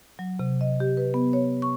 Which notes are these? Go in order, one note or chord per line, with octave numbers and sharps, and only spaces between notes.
F#3
C3
D#5
G4
B4
B3
C#5
C#6